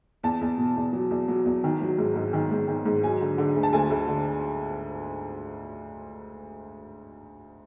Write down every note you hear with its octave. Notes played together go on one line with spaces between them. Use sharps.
E2 A5
E2
B2
E2
F#3
E2
F#3
E2
D#3
F#3
G#2
G#2
D#3
G#2
D#3
G#2
F#3 G#5
D3
D3
D2
A5
D2 G#5
D2
D3